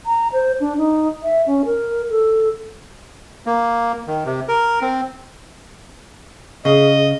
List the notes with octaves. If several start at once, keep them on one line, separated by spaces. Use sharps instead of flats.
A#5
C5
D4
D#4
E5
C#4
A#4
A4
A#3
D#3
C3
A#4
C4
C#3 G#4 D#5